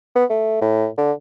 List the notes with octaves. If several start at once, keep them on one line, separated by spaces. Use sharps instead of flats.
B3
A3
A2
D3